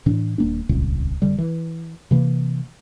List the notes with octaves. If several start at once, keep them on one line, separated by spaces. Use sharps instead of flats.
A2 E3 D4
D#1 A#3 D4
D#1 G#1 C#2 A#2
F#1 D3 G3
E3
C3 E3 A#3